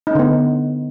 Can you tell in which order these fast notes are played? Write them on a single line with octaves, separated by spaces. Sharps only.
D#4 C#4 D3 B3